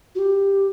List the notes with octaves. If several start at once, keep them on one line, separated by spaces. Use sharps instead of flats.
F#4
G4